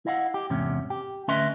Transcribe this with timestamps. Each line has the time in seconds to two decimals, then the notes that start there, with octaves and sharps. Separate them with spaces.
0.06 E4 D#5 F5 F#5
0.34 G4
0.50 E2 G#2 C3 C#4
0.90 G4
1.28 D2 C#4 B4 D#5 E5 C6